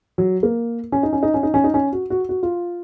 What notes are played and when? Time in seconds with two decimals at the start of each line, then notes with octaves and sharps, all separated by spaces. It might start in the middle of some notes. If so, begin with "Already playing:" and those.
0.18 F#3
0.43 A#3
0.92 C#4
1.03 D#4
1.13 C#4
1.23 D#4
1.34 C#4
1.43 D#4
1.54 C#4
1.64 D#4
1.74 C#4
1.92 F#4
2.10 F#4
2.29 F#4
2.43 F4